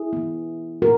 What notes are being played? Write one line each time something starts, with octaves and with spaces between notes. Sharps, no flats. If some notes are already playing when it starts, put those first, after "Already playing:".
Already playing: E4 G#4
E3 B3
A#2 F#4 A#4